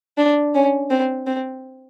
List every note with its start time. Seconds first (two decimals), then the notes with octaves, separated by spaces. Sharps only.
0.18 D4
0.55 C#4
0.90 C4
1.27 C4